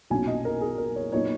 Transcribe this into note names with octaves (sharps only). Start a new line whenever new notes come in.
B1 A#2 F#3 C#4 G#5
D#5
A#4
G#4
A#4
C#5
A#2 F#3 B3 D#4 C#5